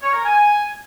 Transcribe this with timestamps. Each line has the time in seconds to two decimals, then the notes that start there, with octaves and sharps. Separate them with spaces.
0.02 C#5
0.13 A#4
0.24 G#5